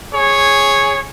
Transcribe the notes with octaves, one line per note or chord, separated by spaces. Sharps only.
G#4 C#5